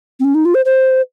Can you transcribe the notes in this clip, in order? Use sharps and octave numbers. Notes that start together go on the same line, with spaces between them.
C4
C#4
D#4
F4
C5
C5